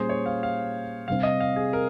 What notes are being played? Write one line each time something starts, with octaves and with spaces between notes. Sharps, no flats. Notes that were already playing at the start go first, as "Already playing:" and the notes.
Already playing: A#2 G3 C#4 G#4 C5
C#5
F5
F5
C3 G3 C4 F5
D#5
F5
G#4
A#4